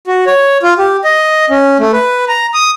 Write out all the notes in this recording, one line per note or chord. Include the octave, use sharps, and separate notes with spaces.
F#4
C#5
F4
G4
D#5
C#4
A3
B4
A#5
D#6